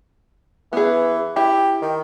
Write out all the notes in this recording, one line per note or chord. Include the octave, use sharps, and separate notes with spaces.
E3 B3 G#4
E4 G4
D#3